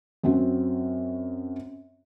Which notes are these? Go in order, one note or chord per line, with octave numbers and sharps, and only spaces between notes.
F#2 C4 F#4